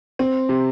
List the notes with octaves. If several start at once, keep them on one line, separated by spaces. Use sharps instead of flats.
C4
C3